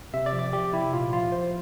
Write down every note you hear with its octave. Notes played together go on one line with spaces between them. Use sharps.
C3 E5
D5
F3
D5
F3 G4
C3 E4
A#2 F4
F3 F4
F3 C5